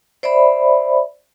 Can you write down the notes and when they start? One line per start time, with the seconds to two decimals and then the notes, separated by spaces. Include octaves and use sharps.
0.23 C5 D5 E5 B5